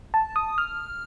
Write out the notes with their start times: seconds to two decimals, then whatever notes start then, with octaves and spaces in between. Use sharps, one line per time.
0.14 A5
0.36 D#6
0.58 F6